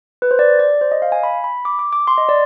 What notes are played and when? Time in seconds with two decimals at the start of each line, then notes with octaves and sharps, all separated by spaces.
0.22 B4
0.31 C5
0.39 D5
0.59 D5
0.81 C5
0.92 D#5
1.02 F5
1.12 G#5
1.23 B5
1.44 B5
1.65 D6
1.79 D6
1.93 D6
2.07 C6
2.18 D#5
2.29 D5